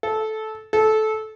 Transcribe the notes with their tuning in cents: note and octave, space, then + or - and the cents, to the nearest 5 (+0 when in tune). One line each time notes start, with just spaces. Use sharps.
A4 -15
A4 -20